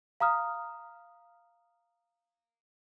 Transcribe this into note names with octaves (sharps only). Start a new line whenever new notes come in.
F5 A#5 D#6 F6